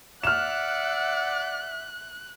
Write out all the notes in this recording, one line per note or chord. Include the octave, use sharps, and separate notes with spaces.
D5 E5 F#5 F6 F#6 E7